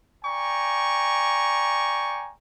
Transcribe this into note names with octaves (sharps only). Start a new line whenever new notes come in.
D5 G5 G#5 A#5 C#6